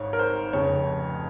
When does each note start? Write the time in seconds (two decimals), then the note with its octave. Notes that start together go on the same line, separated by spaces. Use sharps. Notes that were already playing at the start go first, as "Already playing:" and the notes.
Already playing: G#1 G#2 C#5
0.13 A#4
0.19 C5
0.53 F1 F2 C#3 C#5